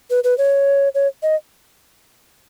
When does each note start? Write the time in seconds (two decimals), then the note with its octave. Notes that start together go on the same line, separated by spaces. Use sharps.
0.10 B4
0.24 B4
0.38 C#5
0.95 C#5
1.23 D#5